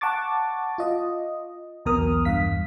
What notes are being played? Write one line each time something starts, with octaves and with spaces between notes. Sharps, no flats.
F#5 A5 C#6 D6 A6
F4 D#5
B1 E2 B2 A#4 D#6 F6
E2 G2 F5 B6